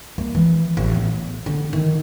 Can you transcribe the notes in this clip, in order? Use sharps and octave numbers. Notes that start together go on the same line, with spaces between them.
A#3
E3
A1
B3
D3
D#3